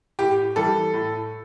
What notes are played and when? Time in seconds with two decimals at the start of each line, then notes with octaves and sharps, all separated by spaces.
0.19 A2 G4
0.56 E3 G3 A4
0.94 A2